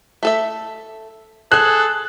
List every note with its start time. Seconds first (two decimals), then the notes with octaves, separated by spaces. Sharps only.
0.23 A3 A4 E5
1.52 G#4 A4 C5 G#5 F#6